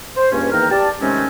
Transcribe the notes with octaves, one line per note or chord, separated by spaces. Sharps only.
C5
C#2 G2 A#3 C#4
E2 D#3 A#3 G5 A#5 F6
G4 D5 A5
C3 D#3 G#3 A3 C4 C#4